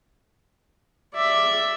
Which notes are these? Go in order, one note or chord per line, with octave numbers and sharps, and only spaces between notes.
D5 E5